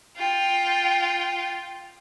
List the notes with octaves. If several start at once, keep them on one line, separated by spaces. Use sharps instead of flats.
F4 G5